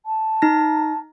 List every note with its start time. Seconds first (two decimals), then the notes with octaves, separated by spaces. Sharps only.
0.06 A5
0.42 D#4 A#6